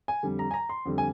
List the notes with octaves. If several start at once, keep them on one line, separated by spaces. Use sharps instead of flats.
G#5
F2 D3 G3
A#5
G#5
A#5
C6
F2 D3 G3
G#5